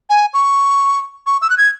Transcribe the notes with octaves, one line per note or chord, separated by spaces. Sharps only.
G#5
C#6
C#6
E6
F#6
G#6